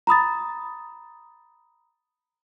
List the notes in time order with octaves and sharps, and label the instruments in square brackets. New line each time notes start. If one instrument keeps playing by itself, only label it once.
[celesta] A#5 B5 D#6 A6